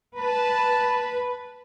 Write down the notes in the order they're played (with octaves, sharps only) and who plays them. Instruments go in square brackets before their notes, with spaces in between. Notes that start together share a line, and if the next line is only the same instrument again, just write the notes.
[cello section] B4 [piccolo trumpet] A5